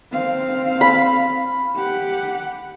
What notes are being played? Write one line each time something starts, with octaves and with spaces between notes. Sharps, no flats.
C4 F5
B5
G4 F#5